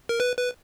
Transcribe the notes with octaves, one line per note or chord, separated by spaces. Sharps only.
A#4
B4
B4